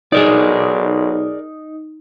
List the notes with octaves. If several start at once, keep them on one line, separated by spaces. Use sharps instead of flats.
B1 D#4 G#4 A#4 D5